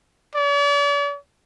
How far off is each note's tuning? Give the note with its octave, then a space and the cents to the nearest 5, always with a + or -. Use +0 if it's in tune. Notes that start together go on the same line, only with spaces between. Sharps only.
D5 -45